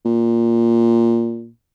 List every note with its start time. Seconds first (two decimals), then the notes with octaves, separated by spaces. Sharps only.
0.05 A#2